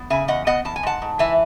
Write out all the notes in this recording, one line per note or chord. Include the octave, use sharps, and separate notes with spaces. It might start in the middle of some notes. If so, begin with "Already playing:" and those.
Already playing: B3
C#3 E5 G#5
E2 D#5 F#5
B3 D#5 F#5
E2 A5
G#5
G#2 F#5 A5
G#2
E3 E5 G#5